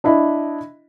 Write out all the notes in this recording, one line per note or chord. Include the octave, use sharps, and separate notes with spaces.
D4 E4 D#5 B5